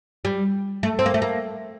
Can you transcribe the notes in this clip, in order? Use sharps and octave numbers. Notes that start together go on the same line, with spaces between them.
G3
A3
C4
A#3
A3
A#3